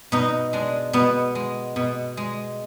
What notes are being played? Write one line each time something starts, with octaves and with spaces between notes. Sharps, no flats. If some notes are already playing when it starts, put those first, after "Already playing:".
B2 D#4
G#3 D4
B2 B3
G#3
B2
G#3